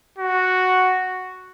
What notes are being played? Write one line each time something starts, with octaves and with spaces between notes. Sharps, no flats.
F#4